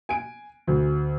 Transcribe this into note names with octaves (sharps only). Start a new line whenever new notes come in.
G#5 D7
D2